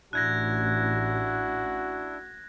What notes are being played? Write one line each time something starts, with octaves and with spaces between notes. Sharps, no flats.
A1 D4 E4 F#4 F#6 G#6 A#6